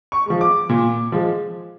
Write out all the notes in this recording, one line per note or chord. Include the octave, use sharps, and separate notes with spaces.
C#6
F3 G#3
D6
A#2
F3 G#3